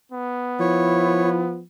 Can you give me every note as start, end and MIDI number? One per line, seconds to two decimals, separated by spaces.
0.12 1.61 59
0.60 1.63 53
0.60 1.41 64
0.60 1.29 73